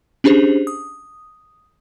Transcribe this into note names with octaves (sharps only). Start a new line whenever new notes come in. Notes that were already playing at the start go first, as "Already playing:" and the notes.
C#4 D4 G4 G#4 C5
D#6